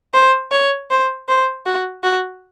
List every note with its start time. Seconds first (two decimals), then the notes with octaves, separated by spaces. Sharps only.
0.14 C5
0.52 C#5
0.90 C5
1.29 C5
1.66 F#4
2.03 F#4